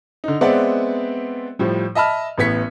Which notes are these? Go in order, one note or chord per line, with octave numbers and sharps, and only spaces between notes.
D3 D#4
G#3 B3 C4 D5 E5 F#5
A2 F3 G3
D#5 E5 A5 B5 F6
A1 A2 B3 G#6 B6 C#7